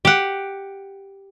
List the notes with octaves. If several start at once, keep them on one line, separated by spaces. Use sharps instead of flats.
G4 F#5